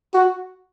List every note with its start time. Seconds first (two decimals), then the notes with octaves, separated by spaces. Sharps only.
0.14 F#4